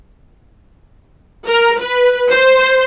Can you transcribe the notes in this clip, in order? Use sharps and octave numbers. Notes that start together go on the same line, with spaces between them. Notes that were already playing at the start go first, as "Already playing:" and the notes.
A#4
B4
C5